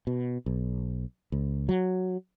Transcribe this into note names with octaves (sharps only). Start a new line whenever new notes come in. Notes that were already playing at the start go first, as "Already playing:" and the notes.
B2
B1
C#2
F#3